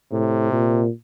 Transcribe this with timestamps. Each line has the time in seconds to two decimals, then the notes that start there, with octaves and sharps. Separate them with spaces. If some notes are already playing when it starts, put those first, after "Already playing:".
0.11 A2 C3
0.53 A#2